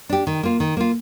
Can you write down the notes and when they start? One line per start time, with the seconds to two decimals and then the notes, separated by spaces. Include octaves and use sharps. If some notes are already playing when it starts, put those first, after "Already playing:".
0.09 D4 G4
0.27 D#3
0.43 A#3 F4
0.60 D#3
0.77 A#3 F4